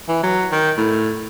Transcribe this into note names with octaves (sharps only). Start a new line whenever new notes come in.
E3
F#3
D#3
A2